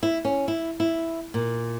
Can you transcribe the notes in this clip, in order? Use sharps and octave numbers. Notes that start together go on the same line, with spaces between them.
E4
C#4
E4
E4
A#2